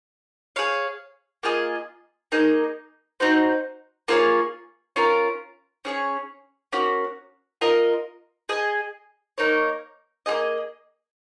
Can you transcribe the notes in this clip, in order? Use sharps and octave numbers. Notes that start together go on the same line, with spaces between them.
G#4 C#5 F5
A#3 F4 G#4 D#5
A#3 D#4 G#4 D#5
C4 D#4 F#4 C5
A#3 F4 G#4 C#5
C#4 F4 A#4
C#4 G#4 C#5
A#3 C#4 F#4
F4 A#4 D#5
G#4 D#5 G#5
A#3 D#4 A#4 C#5
A#3 F4 G#4 D#5